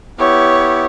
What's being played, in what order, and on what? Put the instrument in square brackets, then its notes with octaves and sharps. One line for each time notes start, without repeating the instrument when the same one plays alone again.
[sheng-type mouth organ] B3 E4 G4 [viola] C#5